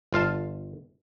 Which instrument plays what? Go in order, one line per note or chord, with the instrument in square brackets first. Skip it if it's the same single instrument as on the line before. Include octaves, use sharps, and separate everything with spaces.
[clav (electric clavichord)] G1 F4 F5 A5